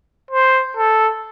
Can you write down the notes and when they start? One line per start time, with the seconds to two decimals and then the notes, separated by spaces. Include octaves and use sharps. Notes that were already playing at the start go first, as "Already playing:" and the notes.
0.31 C5
0.77 A4